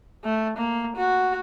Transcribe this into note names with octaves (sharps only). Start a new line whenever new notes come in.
A3
A#3
F#4